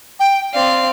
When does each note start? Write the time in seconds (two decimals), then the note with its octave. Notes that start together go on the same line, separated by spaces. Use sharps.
0.20 G5
0.54 C4 D5 F5